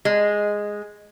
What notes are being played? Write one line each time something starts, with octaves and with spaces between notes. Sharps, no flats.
G#3